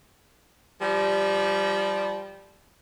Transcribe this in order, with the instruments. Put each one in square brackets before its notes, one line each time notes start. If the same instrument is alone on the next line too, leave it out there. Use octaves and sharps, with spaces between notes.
[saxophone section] F3 G3